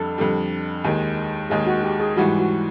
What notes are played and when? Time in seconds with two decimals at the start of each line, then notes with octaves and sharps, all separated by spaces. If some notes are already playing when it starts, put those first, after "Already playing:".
Already playing: F2 D3 G3 A4
0.18 F2 D3 G3
0.84 D#2 D#3 G#3
1.50 D#2 D#3 G#3 G#4
1.66 F#4
1.83 G4
2.00 G#4
2.17 G#2 E3 G3 F#4
2.39 F#4